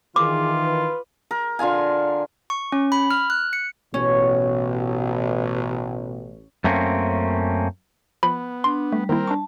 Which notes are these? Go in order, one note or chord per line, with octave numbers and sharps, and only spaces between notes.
D#3 E3 F4 G#4 D6
B4
A#4
D3 F4 F5 G#5
C#6
C#4
B5
F6
F#6
C#7
A1 B2 C#4
F#2 A3 A#3 C4 C#4
F3 B3 B5
D4 C6
G3 A3
D#3 A#3 C4 E4 A#4
D4 A5 C#6